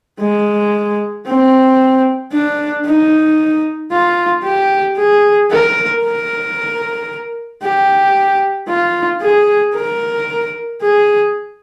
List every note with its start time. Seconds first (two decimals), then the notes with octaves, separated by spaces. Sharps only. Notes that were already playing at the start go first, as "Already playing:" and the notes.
0.21 G#3
1.27 C4
2.33 D4
2.86 D#4
3.92 F4
4.45 G4
4.98 G#4
5.52 A#4
6.04 A#4
7.63 G4
8.69 F4
9.22 G#4
9.75 A#4
10.82 G#4